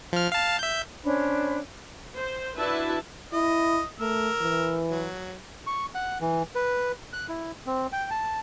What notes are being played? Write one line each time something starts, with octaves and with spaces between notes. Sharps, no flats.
F3 F6
F5 A5
E5 G6
C#4 D4 C5 B5
C5
D4 E4 F#4 B4 E5 A5
E4 D#5
A3 A#4 E6
E3
F#3
C#6
F#5
E3
B4
F#6
E4
C4
G5
A5